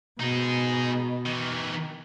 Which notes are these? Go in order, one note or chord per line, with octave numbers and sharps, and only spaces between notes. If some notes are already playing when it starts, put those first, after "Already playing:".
B2 D#4 G#4
D#3 E3